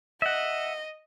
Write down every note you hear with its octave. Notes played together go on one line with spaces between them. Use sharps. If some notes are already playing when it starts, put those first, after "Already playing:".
D#5 E5 F#5